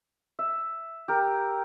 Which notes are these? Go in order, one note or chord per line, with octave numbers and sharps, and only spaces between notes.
E5
G4 A#4